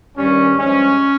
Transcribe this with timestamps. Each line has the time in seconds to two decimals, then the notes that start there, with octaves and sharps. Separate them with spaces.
0.17 G2 D#3 G3 C#4
0.57 G2 F3 G#3 C#4